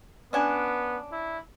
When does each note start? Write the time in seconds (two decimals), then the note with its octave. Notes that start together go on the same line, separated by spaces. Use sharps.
0.33 B3 C#4 D4 G#5
1.12 E4